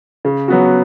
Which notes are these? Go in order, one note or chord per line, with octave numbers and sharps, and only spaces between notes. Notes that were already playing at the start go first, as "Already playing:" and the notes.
C#3
F#3 B3 F#4